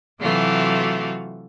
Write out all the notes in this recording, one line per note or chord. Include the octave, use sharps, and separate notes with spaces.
C3 E3 F#3 A3 F4 F#4